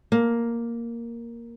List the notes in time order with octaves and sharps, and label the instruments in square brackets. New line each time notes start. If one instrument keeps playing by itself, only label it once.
[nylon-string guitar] A#3